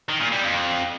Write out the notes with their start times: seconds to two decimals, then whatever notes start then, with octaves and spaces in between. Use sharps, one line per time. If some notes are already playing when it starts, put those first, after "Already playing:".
0.09 D#3
0.21 A#2
0.32 G3
0.44 F2